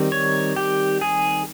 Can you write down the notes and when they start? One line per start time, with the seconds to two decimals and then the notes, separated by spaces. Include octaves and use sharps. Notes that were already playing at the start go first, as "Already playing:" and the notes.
Already playing: D#3 G3 C4 D#4
0.12 C#5
0.56 G4
1.01 G#4